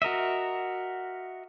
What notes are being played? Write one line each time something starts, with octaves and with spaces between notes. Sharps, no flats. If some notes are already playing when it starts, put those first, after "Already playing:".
F#4 A#4 D#5 E5